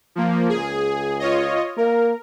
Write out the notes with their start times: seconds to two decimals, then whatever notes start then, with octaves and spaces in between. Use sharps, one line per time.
0.15 F3 A#3
0.49 C#2 G#4
1.20 F4 C#5 D#5
1.77 A#3 A#4